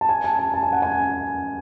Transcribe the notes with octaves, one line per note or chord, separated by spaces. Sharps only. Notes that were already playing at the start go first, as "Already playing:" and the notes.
A5
G#5
A5
A5
A5
G#5
F#5
G#5